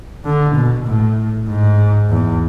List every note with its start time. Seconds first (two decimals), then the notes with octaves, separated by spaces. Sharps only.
0.25 D3
0.56 B2
0.87 A2
1.49 G#2
2.10 E2